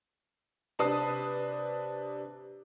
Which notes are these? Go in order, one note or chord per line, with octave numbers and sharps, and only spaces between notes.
C3 D4 B4 A5 D#6 C7